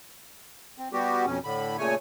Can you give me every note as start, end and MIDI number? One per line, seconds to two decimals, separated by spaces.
0.78 0.88 60
0.93 1.25 55
0.93 1.25 59
0.93 1.25 66
0.93 1.25 67
1.26 1.38 41
1.26 1.38 47
1.26 1.38 61
1.44 1.77 45
1.44 1.77 50
1.44 1.77 83
1.78 1.95 46
1.78 1.95 49
1.78 1.95 57
1.78 1.95 73
1.78 1.95 80